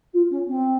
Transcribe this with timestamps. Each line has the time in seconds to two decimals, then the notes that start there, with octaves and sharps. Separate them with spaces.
0.13 F4
0.30 C#4
0.47 C4